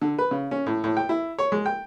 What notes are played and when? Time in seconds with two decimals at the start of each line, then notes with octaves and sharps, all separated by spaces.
0.02 D3
0.19 B4
0.31 C#3
0.51 C#4
0.66 A2
0.84 A2
0.97 G5
1.09 E4
1.39 C#5
1.52 G#3
1.66 G5